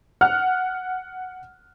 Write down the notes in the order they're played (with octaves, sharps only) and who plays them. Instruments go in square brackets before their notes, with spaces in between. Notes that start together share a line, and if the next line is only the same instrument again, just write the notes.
[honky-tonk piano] F#5 F6 F#6